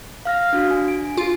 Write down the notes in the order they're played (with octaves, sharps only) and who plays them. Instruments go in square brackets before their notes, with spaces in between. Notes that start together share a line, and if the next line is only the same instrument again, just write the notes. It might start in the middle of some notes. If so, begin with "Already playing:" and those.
[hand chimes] F5 F6 A#6
D4 F#4
G#5
D7
[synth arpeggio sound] F4